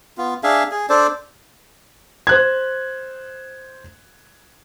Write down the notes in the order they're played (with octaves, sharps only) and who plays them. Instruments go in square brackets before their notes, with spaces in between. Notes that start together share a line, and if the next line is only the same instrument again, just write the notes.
[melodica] B3 F4
D4 G#4 E5 F5
G#4
D4 A4 C5 D5
[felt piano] C5 F#6 G#6